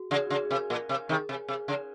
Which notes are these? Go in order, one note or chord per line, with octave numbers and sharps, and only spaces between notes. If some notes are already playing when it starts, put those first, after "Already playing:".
Already playing: F#4 G#4
C#3 G#4
F#4
C#3 G#4
G#4
C3 A#4
A#2 A#4
C3
C3 D#3 G#4
C3
C3 G#4
C#3